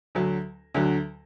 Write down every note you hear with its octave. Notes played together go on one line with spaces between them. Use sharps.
D2 D3 F#3
D2 D3 F#3